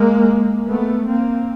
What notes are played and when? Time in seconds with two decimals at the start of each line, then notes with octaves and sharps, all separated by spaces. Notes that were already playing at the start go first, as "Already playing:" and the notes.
Already playing: G#3 A#3
0.68 A3 B3
1.07 A#3 C4